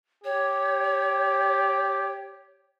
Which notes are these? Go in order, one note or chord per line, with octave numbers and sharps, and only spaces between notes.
G4 C#5